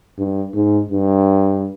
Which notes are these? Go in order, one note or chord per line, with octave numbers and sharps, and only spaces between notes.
G2
G#2
G2